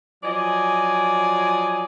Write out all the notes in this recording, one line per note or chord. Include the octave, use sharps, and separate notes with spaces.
F3 F#3 D5 D#5 G#5